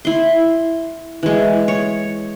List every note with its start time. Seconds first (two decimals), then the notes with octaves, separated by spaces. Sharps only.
0.05 E4 C6
1.23 E3 G#3
1.68 C#5